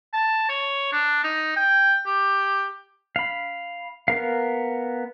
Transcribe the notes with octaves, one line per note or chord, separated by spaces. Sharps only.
A5
C#5
D4
D#4
G5
G4
F5 B5
B3 A#4 F5